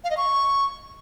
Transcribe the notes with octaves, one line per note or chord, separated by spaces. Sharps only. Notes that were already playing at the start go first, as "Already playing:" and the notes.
F5
D#5
C#6